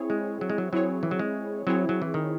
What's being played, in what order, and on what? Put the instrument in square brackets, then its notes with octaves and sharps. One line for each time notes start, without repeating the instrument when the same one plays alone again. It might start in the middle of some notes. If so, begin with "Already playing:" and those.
Already playing: [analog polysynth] C4 E4 G#4 C#5
[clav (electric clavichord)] G#3
F#3
G#3
F#3
[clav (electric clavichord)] F#3 [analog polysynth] C4 E4 G#4 C#5
[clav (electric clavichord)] E3
F#3
G#3
[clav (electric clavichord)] F#3 [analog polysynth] C4 E4 G#4 C#5
[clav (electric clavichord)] F#3
E3
D#3